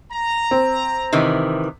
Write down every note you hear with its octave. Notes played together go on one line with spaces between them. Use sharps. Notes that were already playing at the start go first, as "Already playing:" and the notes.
A#5
C4
C3 D#3 E3